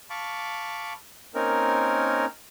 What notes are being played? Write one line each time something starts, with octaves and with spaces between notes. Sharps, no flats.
F5 A5 B5 C#6 D6
A#3 C4 C#4 D#4 A#4